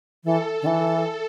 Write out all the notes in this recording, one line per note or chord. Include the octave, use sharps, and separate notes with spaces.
E3 A4
D3
E3